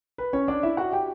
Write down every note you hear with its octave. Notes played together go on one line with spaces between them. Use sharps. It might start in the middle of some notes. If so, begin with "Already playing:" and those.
B4
C#4 C#5
D4 D5
E4 E5
F#4 F#5
G4 G5